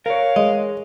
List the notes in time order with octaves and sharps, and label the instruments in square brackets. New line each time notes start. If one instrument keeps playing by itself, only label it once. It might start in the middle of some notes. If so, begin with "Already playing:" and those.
[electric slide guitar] A#4 C#5 [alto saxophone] F5
[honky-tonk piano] G#3 [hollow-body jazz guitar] D#5